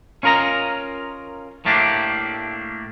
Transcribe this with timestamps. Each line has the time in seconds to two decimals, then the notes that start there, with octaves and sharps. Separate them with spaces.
0.23 C#4 F4 A#4 D#5 A#5
1.65 A2 A3 A#3 D4 G4